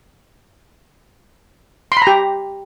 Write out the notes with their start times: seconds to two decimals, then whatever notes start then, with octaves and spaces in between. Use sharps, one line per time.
1.92 C6
1.97 B5
2.02 A#5
2.07 G4